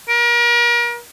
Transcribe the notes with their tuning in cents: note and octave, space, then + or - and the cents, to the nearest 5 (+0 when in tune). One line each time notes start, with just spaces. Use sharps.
A#4 +35